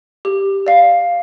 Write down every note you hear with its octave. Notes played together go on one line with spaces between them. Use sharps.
G4
D5 F5